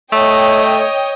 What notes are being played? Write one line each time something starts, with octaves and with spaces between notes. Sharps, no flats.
A3 C#5 D#5 G5